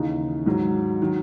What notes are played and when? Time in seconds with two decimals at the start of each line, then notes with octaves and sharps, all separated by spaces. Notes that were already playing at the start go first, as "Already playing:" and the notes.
Already playing: D#2 C#3 E3 D#4
0.46 G#2 D#3 F#3
1.02 D#3 F#3